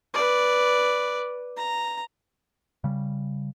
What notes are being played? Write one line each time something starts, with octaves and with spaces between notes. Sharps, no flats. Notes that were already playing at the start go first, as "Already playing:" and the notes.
B4 D5
A#5
C#3 G3